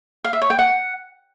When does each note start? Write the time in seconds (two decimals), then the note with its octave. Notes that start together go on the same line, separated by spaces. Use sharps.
0.24 F5
0.33 E5
0.42 C#5
0.50 G5
0.59 F#5